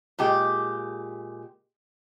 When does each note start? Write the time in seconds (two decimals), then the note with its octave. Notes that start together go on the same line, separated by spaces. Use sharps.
0.19 A#2 G#3 G4